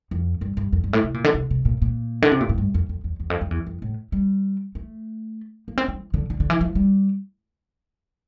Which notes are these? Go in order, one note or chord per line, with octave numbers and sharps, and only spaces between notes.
F2
G2
G2
F2
G2
A2
C3
A#2
D3
C3
C3
A#2
A#2
D3
C3
A#2
A2
G2
F2
F2
E2
E2
F2
F2
E2
F2
A2
G3
A3
A#3
C4
D4
E3
D3
D3
D3
E3
F3
G3